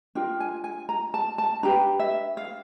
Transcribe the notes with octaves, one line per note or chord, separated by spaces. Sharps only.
D4 F4 A#4 G5
G#5
G#5
A#5
A5
A5
D4 G4 B4 A#5
E5
F5